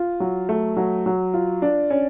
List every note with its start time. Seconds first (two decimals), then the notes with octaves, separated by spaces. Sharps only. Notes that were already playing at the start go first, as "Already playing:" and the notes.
Already playing: F4
0.20 F#3
0.49 A3
0.77 F#3
1.06 F#3
1.34 F4
1.62 D4
1.91 C#4